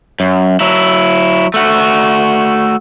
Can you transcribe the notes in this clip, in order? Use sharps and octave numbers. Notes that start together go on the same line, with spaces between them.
F#2
F#3 E4
A3 F#4